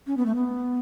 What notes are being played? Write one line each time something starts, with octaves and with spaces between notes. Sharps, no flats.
C#4
B3
A3
B3